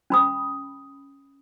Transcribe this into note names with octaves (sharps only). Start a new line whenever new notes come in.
C#4 B5 D#6